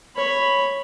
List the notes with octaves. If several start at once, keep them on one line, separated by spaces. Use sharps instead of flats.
C#5 B5